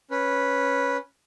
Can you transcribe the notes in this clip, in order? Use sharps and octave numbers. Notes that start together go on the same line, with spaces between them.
C#4 B4